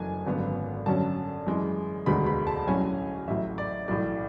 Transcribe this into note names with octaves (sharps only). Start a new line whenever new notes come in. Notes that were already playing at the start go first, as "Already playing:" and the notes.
Already playing: F#1 F#2 E3 A3 D4 G#5
G#1 F#2 D3 F#3 B3
F#2 D3 F#3 C#4 A5
F#2 E3 G#3
E1 D2 D3 G#3 B3 B5
B5
A5
B1 A2 F#3 C#4 G#5
A1 A2 F#3 E5
D5
B1 A2 E3 D5